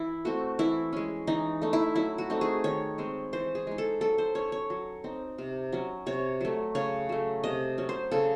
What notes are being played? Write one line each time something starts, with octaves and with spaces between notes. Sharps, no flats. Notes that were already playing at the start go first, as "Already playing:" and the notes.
Already playing: E3 E4
A3 C4 F#4
E3 E4
G#3 C#4
E3 D#4
A3 D#4
E4
F#3 E4
F#4
A3 C4 D#4
G#4
D#3 C#5
G#3 C4
E3 C5
G#4
G#3 D#4
A4
F#3 A4
C5
C#4 C#5
C#5
F#3
C4 D#4
C3
F#3 C#4
C3 C#5
F#3 A3
C#3 C#5
F#3 A3
C3 D#5
F#3 C#4
C5
C#3 A4